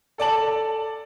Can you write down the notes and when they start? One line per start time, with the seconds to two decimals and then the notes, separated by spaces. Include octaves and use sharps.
0.18 A4 D5 A5 F#7